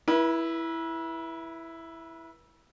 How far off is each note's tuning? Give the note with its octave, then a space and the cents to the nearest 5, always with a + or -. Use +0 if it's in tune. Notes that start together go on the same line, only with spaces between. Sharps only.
E4 +0 B4 -35